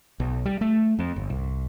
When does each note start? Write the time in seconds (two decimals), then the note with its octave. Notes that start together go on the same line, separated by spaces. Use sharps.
0.20 B1
0.45 G3
0.61 A3
0.99 F2
1.16 G1
1.30 C2